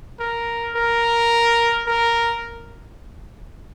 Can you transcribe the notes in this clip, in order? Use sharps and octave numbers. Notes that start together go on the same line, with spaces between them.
A#4
A#4
A#4